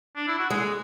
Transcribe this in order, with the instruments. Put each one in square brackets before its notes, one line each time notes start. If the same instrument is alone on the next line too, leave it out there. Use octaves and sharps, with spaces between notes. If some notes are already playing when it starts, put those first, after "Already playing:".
[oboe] D4
E4
F#4
[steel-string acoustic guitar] G#3 [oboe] G#4